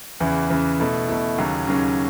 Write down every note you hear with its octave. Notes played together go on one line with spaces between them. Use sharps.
E2 C#3 E3
E2 C#3 E3
B2 A3 E4
B2 A3 E4
D#2 C#3 F#3 C#4
D#2 C#3 F#3 C#4